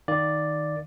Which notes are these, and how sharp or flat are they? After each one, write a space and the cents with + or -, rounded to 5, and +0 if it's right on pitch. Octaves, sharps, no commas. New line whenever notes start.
D#3 +0 D5 +0 F5 +0